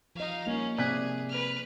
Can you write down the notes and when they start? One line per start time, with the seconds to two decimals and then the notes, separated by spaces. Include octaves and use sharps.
0.15 F3 D#4 D#5 F5
0.47 G3 A#3 C#4 D#4
0.78 C3 G#4 D5 F#6 B6
1.29 B4 F6